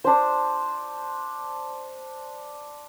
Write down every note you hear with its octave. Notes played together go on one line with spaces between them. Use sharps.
D4 C5